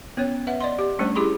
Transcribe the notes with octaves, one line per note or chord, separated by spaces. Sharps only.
B3 C#4 C#5
B4 E5 F#5
D5 D#5 C6
G4
G3 A3 C#4 D4 C5
A3 E4 G4 G#4 B5 C6